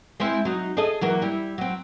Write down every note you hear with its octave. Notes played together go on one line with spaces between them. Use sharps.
G#3 C4 E4
F#3 D#4
G#4 A4 D#5
E3 F#3 A#3
G3 E4
F#3 C4